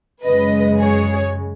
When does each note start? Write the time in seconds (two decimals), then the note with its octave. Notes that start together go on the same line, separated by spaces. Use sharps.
0.24 F#2 C#3 G#3 B4 D#5
0.79 G#4 C#5